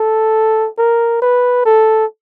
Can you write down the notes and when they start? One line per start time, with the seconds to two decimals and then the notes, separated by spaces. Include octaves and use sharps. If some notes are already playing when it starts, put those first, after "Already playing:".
Already playing: A4
0.78 A#4
1.22 B4
1.66 A4